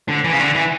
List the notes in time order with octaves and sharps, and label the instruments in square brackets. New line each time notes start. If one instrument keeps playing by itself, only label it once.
[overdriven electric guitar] D3
E3
C#3
D3
E3